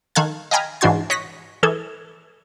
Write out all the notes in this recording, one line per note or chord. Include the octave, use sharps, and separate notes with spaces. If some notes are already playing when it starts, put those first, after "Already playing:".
D#3 A4 F5 F#6 G#6
D#5 F5 G5 G#5 A#5 B5
G#2 E3 D4 F#4 C6 G#6
C#5 D#5 F#6 A#6 B6
E3 G#4 A4 G#6